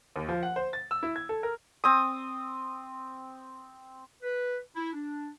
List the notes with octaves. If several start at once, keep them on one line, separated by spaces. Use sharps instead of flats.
D#2
F3
F#5
C5
A6
E6
E4
G#6
A4
A#4
C4 D#6
B4
E4
D4